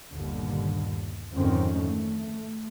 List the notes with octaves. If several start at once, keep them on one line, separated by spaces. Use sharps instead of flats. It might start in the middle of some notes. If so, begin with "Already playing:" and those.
G1 D#2 A#2 D3
F2 G#2 D3 D#3 C4 C#4
A3